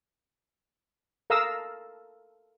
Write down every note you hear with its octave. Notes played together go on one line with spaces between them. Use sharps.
A4 A#4 F5 A#5 D#6 E6